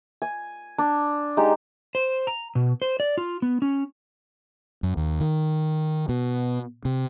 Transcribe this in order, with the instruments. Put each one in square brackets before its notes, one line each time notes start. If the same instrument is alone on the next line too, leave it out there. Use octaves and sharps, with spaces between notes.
[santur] G#5
D4
G#3 D#4 G4
[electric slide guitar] C5
A#5
B2
C5
D5
F4
B3
C#4
[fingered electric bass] F#2
D#2
D#3
B2
C3